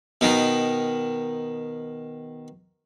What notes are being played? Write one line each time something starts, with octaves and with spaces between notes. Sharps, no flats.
B2 D#3